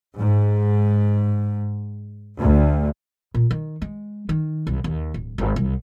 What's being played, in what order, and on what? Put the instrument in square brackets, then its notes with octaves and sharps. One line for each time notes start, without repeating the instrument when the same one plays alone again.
[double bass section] G#2
D2
[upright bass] A#2
D#3
G#3
D#3
C2
D#2
D1
G#1
C2